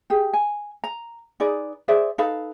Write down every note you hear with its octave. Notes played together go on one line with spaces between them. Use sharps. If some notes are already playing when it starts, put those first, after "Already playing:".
G4 G#4
G#5
A#5
D#4 G#4 B4 D5
G#4 C5 D5 E5
D#4 A4 B4 F5